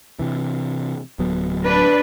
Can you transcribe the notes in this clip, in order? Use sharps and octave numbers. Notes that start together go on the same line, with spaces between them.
C3 E3
D1 F#3 B3
D4 B4